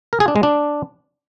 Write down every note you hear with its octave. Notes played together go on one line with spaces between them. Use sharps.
A#4
G#4
D4
G#3
D4